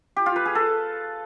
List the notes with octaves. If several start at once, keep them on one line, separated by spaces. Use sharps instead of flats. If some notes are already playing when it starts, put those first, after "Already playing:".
G4
F4
B4
G#4
A4